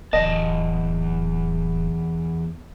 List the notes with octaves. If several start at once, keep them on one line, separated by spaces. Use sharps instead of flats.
D1 E2 D#5 A5